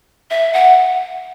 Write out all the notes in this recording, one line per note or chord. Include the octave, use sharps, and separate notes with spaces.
E5
F#5